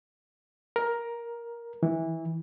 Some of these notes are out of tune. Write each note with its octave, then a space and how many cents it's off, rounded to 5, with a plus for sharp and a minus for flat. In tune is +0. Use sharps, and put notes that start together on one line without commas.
A#4 +10
E3 -15